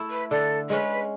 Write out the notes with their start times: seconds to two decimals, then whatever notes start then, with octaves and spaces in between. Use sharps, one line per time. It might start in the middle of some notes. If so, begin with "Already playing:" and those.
Already playing: A3 E4
0.10 B4
0.30 D3 A4
0.70 G#3 C#4 B4